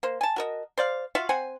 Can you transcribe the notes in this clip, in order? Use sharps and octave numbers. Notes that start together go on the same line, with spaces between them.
A#3 C5
G#5 A5
F#4 A#4 D#5
C5 D5 F5
F4 F#4 E5 F5
C4 C5 F#5 G#5